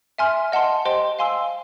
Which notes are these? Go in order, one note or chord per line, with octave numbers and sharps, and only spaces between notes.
E5 G#5 C6 F6
D#5 F#5 A5 C6
G4 C5 D#5 G5 C6
F5 G#5 C6 E6